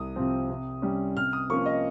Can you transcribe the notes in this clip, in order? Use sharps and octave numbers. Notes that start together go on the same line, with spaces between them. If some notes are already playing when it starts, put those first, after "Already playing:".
Already playing: C2 D#6
C3 F3 C4
C3
G3 C#4
C3 F6
D#6
F3 A#3 C#4 C#6
D#5